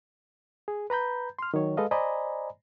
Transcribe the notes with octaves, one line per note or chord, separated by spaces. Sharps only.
G#4
B4 A#5 B5 G6
C6 F6
D#3 F#3 C#5
G#3 A4 B4 D#5 F5
C5 D5 D#5 G#5 A#5 B5